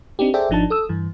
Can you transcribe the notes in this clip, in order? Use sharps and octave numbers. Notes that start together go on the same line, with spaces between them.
C4 D4 D#4 G4
G#4 A4 C5 D5 E5 G5
G#1 F3 D4 D#4 A5
A4 D#6 E6
G2 E3